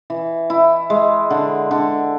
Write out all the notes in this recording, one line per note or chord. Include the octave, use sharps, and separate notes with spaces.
E3
E4
G#3
D3
D3